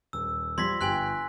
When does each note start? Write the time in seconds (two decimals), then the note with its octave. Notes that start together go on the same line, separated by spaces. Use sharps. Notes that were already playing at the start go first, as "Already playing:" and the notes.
0.13 D#1 E6
0.58 F3 G3 C6 G#6 A#6 B6
0.81 G1 G5 G#5 C6 F#6